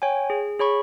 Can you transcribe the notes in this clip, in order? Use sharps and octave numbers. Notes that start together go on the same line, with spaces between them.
C#5 G5 G#5
G#4
G#4 C#5 B5 C#6